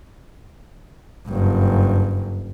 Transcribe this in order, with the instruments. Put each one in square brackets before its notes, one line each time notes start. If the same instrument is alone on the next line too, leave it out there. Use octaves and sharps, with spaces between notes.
[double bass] F#1 G2